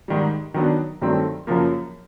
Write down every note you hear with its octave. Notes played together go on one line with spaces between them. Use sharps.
G#2 D#3 G3
D#3 F#3 B3 D4
G2 D#3 F#3 A3 C4
F#2 C#3 F3 A#3